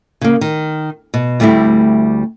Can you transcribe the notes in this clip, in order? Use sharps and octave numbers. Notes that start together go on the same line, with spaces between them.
C#3 A#3
D#3
B2
D2 G3 A3 C4 E4